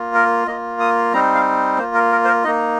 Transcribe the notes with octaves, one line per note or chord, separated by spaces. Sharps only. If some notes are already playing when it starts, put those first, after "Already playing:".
Already playing: A#3 F4
A#4
A#3 F4 D#5
D#6
G3 C4 D#4 A#5
F5
A#3 F4 C5
A#4
A#4
C5
A#4
A#3 D#4 D#5